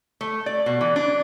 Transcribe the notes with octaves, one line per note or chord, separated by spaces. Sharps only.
A3
D5
B2
E3
D4